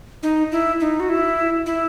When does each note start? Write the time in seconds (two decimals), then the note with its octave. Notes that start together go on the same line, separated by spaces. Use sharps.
0.23 D#4
0.52 E4
0.80 D#4
1.00 F#4
1.09 E4
1.66 E4